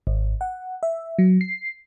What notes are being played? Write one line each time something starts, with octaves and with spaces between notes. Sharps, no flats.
G#1
F#5
E5
F#3
C7